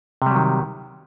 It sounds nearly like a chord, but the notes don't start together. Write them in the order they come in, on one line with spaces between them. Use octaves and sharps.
C3 G3 F#3 D#3